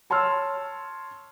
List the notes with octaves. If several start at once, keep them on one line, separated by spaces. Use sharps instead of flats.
C#5 A5 C6 E6 F6